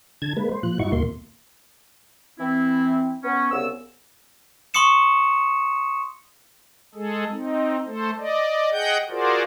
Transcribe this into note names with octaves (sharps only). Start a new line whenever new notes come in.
D3 A5 G#6
G#3 A#3 B4
C5
A#2 F3 F#6
G2 D#4 E4 F#4 C#6
D#2 A#2 A#3 C6
E3 C4 E4
B3 C#4
C2 C#3 B3 E6
C6 C#6 D#6 C#7 E7
G#3 G#4 A4
C4 D#4
A3 A4 C5
D5 D#5
G#4 D#5 F#5 G5 G6
F4 F#4 G#4 A#4 C5 D5